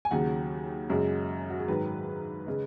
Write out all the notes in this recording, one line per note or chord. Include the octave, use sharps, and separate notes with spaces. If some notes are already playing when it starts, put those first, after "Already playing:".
G#5
D#2 C#3 F#3 F#5
F#2 C#3 G#3
F#4
G#4
G#2 D#3 F#3 B4
C#3 G#3